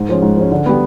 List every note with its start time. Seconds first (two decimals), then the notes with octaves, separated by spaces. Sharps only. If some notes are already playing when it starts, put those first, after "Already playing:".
Already playing: G#2
0.09 F3 G#3 C#4
0.22 G#2
0.37 F3 G#3 C#4
0.52 D3
0.66 G3 B3